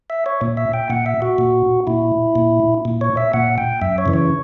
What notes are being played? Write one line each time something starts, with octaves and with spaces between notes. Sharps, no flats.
E5
C#5
A#2
E5
G5
A#2 F#5
E5
F#4
A#2
A#2 E4
A#2
A#2
C#5
E5
A#2 F#5
G5
F#2 E5
C#5
C#3 E3
C#5